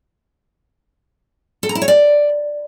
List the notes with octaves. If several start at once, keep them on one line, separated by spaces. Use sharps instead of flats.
A4
A#5
E4
C#5
D5